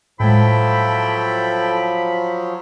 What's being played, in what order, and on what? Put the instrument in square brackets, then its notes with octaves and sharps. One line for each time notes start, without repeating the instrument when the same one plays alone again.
[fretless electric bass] A2 G#3 [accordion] F3 F#3 [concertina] E4 A4 G5 [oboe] B5